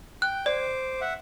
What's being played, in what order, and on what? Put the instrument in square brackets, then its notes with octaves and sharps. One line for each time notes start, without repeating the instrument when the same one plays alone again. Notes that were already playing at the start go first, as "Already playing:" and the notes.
[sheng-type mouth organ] G5 [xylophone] F#6
[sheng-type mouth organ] C5 D6 [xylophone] D5
[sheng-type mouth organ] E5 F#5